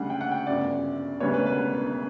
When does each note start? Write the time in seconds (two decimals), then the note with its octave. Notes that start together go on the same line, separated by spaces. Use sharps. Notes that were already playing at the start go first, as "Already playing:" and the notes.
Already playing: D2 C#3 G3 F#5
0.10 G5
0.21 F#5
0.31 G5
0.46 G1 F#2 C#3 D5
1.20 E1 D2 C#3 G3 B3 C#5
1.34 B4
1.46 B4